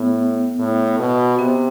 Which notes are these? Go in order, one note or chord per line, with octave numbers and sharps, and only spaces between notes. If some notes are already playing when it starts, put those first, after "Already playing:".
Already playing: A2 B3
A2
B2
C3 B3